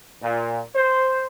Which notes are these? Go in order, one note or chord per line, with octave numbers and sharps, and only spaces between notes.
A#2
C5